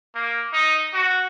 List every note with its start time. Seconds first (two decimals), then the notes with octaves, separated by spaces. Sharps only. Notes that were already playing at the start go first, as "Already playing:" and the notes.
0.15 A#3
0.53 D#4
0.94 F#4